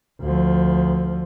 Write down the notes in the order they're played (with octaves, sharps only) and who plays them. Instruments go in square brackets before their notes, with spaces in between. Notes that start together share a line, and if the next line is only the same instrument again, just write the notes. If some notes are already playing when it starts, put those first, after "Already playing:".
[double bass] D2 F3